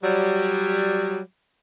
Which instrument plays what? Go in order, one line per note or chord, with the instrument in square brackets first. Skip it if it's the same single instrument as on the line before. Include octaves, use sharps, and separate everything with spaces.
[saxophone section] F#3 G3